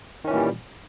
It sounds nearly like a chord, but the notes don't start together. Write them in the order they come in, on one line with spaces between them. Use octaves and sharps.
D#3 C#4 E3 A#2 G3